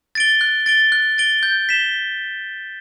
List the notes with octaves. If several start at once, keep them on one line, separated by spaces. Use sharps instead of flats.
A6 D7 G7
F#6
A6 D7 G7
F#6
A6 D7 G7
G6
B6 E7 G7